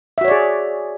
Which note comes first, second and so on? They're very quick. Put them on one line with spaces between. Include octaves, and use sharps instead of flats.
E5 F#4 C#5 D5 G#4